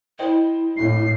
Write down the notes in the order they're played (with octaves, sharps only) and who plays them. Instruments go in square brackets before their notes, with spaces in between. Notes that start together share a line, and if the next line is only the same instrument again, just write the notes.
[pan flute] E4 [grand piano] C5 D#5 G5
[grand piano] G#1 D2 [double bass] A2 [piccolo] C7